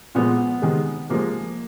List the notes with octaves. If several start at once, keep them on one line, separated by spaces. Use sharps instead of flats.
A#2 F3 G#3 B3
C3 D#3 G#3
C3 F3 G#3 A#3